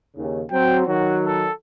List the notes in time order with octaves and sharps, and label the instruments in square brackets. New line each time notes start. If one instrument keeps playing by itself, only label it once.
[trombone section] D#2 C#3
[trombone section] F#3 C4 [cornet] G5
[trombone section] D#3 F#3 [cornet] F#4
[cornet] A4